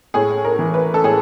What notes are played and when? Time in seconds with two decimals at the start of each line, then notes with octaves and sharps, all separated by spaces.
0.14 A2 G#4
0.45 A#4
0.59 E3
0.74 B4
0.94 A4
1.04 A2 G#4